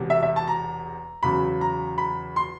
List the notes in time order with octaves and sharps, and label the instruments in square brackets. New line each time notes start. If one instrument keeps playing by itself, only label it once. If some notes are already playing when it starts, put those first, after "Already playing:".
Already playing: [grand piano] E1 E2 C3
E5
E5
A5
A#5
E2 C#3 F#3 B5
A#5
B5
C6